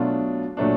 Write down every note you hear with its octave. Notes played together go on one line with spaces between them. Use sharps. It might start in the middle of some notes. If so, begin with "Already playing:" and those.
Already playing: B2 F#3 A3 D4 F4
A#2 F#3 A3 D4